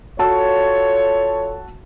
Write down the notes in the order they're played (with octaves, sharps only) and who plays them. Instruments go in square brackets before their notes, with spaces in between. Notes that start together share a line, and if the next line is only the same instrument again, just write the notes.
[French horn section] F4 A4 C#5 [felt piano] F#4 A5 E6